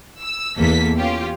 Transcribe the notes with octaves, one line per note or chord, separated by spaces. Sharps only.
E6
E2 A#3 A4 B6
C#4 F4 G4